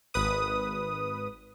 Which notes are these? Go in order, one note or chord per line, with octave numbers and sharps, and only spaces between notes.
G#1 B4 D#6